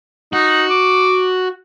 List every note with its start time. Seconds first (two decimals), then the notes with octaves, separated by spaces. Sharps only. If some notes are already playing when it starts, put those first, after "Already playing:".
0.33 D#4 F#4
0.70 D6